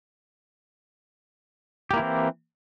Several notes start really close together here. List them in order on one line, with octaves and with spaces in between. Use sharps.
G4 A#3 E4 E3 C4